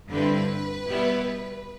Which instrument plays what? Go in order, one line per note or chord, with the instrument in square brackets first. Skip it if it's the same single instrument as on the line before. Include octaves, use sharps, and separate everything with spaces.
[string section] G2 D3 G3 C4 E4 B4
B2 G3 B3 E4